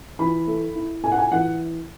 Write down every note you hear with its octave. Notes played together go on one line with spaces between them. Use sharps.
E3 B5
A3
E4
A2 G#5
F#5
G#5
E3 F#5